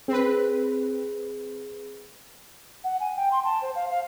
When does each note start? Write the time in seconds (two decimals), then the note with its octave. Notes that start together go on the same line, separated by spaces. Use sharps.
0.08 C4 G#4 B4
2.84 F#5
3.00 G#5
3.16 G5
3.32 C6
3.44 A5
3.62 C5
3.75 F5
3.90 F5